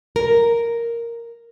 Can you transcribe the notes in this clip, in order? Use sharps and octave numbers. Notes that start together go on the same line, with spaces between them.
A#4